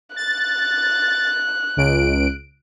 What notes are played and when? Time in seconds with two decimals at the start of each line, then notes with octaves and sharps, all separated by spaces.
0.16 F#6 A6
1.77 C#2 D7